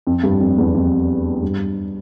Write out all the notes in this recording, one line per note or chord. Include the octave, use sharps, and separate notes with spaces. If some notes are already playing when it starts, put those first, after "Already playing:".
F2
G2
F2
E2
F2
G2